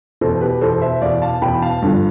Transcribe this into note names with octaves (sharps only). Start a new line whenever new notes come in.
E2 B2 A4 C5
G4 B4
E2 B2 A4 C5
C5 E5
E2 B2 D5 F5
F5 A5
E2 B2 G5 B5
F5 A5
G2 D3 F3